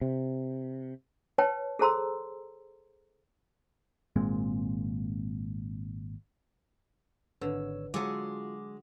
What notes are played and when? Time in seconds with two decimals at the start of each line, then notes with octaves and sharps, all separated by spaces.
0.01 C3
1.38 B4 C#5 G5 A5
1.79 G#4 A4 C5 A#5 C6 E6
4.16 G#1 A#2 G#3 C4
7.41 G#1 D3 B4 C#5 E6
7.94 F#3 G#3 F4 F#4 A4 G#5 D6